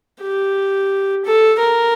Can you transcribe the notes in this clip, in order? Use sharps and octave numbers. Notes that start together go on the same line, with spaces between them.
G4
A4
A#4